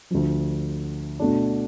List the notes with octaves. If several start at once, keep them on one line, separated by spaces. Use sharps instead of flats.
D2 D3 F3
B2 A3 D4